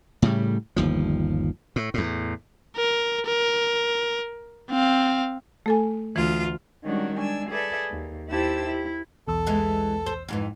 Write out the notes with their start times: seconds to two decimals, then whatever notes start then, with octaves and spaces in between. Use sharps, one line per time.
0.22 A2 C#3 G3
0.76 G1 D#2 F3
1.76 A2
1.94 E2 A2
2.76 A#4
3.26 A#4
4.71 C4 F5
5.66 A3 A4 G#5
6.16 D2 E3 F4
6.83 D#3 G3 G#3 C#4 D4 F#4
7.15 G#3 D4 G#5 E6
7.50 G#4 A4 B4 D5 E5
7.90 D#2
8.29 D#2 E4 G4 C5 A5 E6
8.65 E4
9.28 B1 E2 A4 E6
9.47 E3 G#3
10.06 C5
10.28 F2 G#2 E3